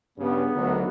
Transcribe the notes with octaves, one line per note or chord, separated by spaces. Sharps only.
G2 C#3 B3
D2 D#3 F#3